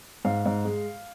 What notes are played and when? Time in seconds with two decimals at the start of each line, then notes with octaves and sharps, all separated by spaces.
0.25 G#2 F5
0.46 G#2
0.65 G#3